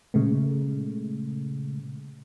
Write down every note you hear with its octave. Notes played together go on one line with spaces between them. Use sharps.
A#2 C#3 G#3 A3